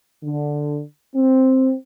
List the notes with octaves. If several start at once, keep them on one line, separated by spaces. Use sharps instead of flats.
D3
C4